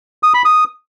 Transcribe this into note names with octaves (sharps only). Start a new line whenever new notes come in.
D#6
B5
D#6